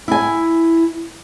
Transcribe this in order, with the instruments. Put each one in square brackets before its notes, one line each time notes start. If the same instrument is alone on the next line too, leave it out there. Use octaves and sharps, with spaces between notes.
[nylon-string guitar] E4 G#5